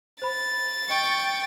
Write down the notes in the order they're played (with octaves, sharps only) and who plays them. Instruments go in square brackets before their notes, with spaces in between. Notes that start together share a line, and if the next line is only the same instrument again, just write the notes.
[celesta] C5 B5 [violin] A6
[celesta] D#5 [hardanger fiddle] G5 [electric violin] C#6